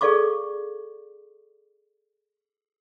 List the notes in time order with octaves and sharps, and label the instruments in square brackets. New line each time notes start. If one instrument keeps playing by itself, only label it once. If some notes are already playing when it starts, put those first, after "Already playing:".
[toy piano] G#4 A4 D5 F5 C#6 D6